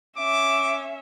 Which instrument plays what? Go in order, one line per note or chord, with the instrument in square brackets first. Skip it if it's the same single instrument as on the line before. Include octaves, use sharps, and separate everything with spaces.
[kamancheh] C#4 E5 [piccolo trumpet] D6